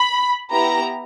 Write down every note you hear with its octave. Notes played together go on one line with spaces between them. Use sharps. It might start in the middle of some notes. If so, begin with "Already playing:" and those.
Already playing: B5
B3 E4 G4 A#5